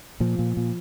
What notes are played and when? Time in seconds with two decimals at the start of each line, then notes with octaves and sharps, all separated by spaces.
0.20 A#2 F3
0.39 A#2
0.57 A#2